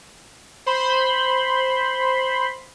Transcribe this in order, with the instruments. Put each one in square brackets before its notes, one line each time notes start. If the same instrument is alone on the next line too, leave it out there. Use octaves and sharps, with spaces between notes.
[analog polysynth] C5 B5 C6